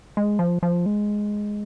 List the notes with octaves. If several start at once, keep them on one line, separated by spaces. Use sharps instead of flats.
G#3
F3
F3
G#3